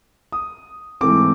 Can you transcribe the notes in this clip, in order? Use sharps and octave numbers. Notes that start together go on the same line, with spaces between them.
D#6
G#2 E3 A3 C4 D6